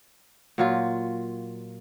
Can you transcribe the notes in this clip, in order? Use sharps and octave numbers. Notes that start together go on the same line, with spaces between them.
A#2 F#3 F4